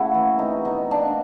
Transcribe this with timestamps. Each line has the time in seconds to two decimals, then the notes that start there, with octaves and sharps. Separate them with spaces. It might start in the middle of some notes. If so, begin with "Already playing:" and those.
Already playing: C#3 A3 A#3 E4 F#4
0.14 E3
0.39 C4 D#4
0.65 B2 D#4
0.91 A#3 D4